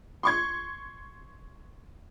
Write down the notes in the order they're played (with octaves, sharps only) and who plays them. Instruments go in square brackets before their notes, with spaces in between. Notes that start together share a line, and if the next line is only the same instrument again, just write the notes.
[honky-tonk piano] C6 C#6 G#6